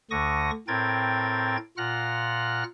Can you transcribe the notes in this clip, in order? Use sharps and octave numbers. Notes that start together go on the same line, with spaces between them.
D2 D3 C#6 D#6 A#6
A2 C4 A#4 G5 G#6 A6
A#2 F4 F#5 F6 F#6 A#6